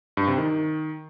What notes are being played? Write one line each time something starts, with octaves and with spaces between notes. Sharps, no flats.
G2
C3
D#3